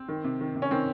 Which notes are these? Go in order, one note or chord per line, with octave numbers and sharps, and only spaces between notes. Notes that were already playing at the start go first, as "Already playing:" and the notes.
Already playing: C4
D#3
C3
D#3
C3
C#4
D#3 C4